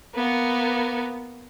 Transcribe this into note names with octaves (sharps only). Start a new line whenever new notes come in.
A#3 B3